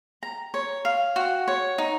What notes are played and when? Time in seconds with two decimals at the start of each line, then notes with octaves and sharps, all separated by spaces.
0.23 A#5
0.54 C#5
0.85 F5
1.16 F#4
1.48 C#5
1.78 D#4